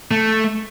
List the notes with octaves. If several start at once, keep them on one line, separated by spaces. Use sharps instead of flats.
A3